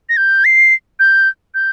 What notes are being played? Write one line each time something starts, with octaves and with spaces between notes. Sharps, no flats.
A#6
G6
C7
G6
G6